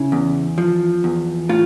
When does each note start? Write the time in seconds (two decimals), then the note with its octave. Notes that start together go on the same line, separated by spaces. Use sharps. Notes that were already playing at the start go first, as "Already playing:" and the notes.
Already playing: C#3 E4
0.12 E2
0.58 F3
1.04 E2
1.49 A2 F4